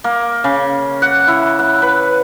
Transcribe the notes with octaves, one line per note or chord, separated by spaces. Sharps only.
A#3
C#3
F#5
E4
F#5
B4